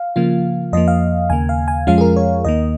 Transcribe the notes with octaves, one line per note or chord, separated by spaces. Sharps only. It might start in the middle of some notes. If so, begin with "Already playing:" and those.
Already playing: F5
C#3 F3 A#3 F4
F2 F3 A#3 D#5
F5
D#2 C#3 A#3 G#5
F5
G#5
F2 F3 G#3 C#4 F4 F5
G#4
A#4
C#5
D#2 D#3 A#3 D#5